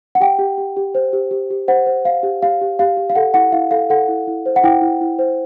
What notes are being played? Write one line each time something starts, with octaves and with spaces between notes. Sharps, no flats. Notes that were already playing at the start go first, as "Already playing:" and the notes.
F#5
G4 G5
G4
G4
G4
C5
G4
G4
G4
C5 F#5
C5
C5 F5
G4
G4 F5
G4
G4 F5
G4
F5
A4 F#5
E4 F#5
E4 F5
A4 F5
A4 F#5
E4
E4
C5
F#5
E4 G5
E4
E4
C5